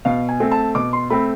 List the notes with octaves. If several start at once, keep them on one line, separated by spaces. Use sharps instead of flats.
B2 F5
G#5
A3 C4
A5
B2 D6
C6
A3 C4 B5